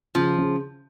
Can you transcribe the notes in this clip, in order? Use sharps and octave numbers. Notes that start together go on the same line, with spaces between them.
C#3 F3
C#3